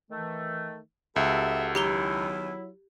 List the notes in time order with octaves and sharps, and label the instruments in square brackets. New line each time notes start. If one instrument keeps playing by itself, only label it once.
[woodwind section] D#3 E3 A3
[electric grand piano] C#2 [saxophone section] G3 E5 [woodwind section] F#4 G4 A4
[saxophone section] E2 D#3 [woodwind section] F#3 E4 [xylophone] G4 A#5 G7